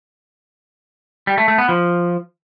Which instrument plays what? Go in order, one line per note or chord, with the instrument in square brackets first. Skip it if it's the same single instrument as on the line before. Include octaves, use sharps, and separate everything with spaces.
[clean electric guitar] G3
A3
A3
B3
F3